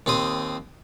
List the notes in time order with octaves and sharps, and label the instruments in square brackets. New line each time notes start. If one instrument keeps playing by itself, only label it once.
[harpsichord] D#2 C4 C5 D#6